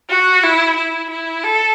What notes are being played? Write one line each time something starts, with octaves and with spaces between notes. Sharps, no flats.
F#4
E4
E4
E4
A4